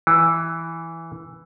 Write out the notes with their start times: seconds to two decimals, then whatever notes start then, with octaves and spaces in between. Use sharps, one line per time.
0.07 E3